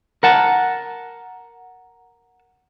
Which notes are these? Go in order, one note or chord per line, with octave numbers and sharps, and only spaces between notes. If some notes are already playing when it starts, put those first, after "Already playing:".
A#4 F#5 A5